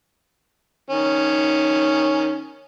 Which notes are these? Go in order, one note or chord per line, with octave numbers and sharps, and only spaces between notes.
D#3 C#4